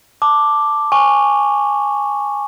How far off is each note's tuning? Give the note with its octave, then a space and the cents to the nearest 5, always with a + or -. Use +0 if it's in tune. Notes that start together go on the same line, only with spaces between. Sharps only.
A5 +0 D6 +0
G#5 -10 C#6 +0